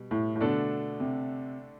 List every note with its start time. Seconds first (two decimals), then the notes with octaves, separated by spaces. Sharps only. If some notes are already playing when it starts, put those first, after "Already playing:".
Already playing: B2 G3
0.11 A2
0.36 A2
0.41 B2 D3 A3 D4 A4
1.00 C3